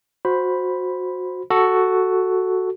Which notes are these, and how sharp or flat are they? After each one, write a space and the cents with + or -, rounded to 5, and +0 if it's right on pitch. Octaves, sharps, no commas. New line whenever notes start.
F#4 -20 C5 +0 B5 +0
F#4 +5 A4 +0